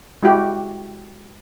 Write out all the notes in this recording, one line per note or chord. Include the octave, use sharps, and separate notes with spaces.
G#3 E4 F#4 G4